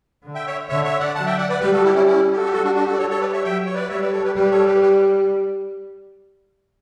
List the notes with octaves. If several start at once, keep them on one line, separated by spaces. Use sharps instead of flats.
D3
E5 G5
C#5 E5
D3 C#5 E5
C#5 E5
D5 F#5
F#3 F#5 A5
E5 G5
D5 F#5
B4 D5
G3 G4 B4
F#4 A4
E4 G4
C#4 E4
C#4 E4
G4
F#4 A4
G4
G3 F#4 A4
D4 F#4
D4 F#4
G4
F#4 A4
D5
G3 A4 C#5
A4 C#5
B4 D5
C#5 E5
F#3 E5 G5
C#5
B4 D5
G3 C#5 E5
B4 D5
A4 C#5
G4 B4
G3 G4 B4
A4 C#5
G4 B4
G4 B4